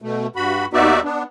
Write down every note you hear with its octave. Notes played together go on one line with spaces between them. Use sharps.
B2 A3
G2 F#4 B5
D#2 B3 D#4 F#4 D5 E5
B3 D4